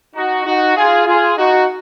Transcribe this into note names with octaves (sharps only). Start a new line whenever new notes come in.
D#4 F#4
D#4 F#4
F4 G#4
F4 G#4
D#4 F#4